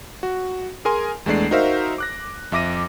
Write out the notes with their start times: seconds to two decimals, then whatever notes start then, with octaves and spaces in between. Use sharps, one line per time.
0.23 F#4
0.85 G#4 A#4 G#5 C6
1.26 E2 G#3 A3 D4 D5 C7
1.51 D#4 F#4 A#4 C5 E5 F5
1.98 D6 F#6 A#6
2.52 F2 E5 D6 A#6 D#7